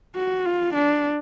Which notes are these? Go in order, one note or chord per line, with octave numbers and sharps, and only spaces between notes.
F#4
F4
D4